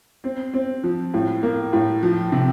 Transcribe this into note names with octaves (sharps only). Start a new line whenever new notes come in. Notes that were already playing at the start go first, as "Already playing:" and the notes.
C4
C4
F3
A2
A#3
A2
F3
C3